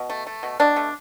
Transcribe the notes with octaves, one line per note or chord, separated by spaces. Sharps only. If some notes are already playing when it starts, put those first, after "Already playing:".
Already playing: B2
A3
A3
B2
B2 D4
A3